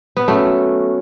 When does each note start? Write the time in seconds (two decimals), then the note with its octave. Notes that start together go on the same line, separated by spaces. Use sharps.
0.17 B3
0.28 F#3 A3 C#4 F#4 A4